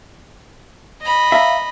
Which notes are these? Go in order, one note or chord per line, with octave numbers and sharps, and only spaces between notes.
D#5 B5
E5 F5 A#5